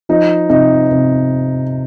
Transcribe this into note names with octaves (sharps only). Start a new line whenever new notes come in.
F3 D#4
C3 D#4
C3